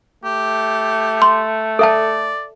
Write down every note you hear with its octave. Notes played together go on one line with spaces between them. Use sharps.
A3 G4
C6
A4 D5 E5 A5